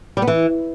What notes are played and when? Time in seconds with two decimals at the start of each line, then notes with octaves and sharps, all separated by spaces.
0.17 G3
0.22 B3
0.27 E3